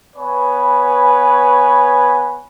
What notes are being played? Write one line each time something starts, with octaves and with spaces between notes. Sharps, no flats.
B3 B4 C#5 G#5